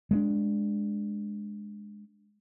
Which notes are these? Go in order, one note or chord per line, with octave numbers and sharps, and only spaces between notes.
G#3 A3 D4